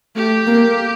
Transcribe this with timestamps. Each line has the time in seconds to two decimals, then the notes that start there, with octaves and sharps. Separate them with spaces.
0.16 A3 G4
0.47 A#3